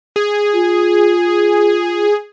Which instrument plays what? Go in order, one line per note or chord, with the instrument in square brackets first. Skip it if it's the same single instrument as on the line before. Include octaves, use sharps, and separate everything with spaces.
[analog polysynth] G#4
[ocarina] F4